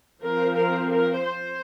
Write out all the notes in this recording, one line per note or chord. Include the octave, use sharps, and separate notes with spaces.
F3 C4 A#4
A#4
A#4
C5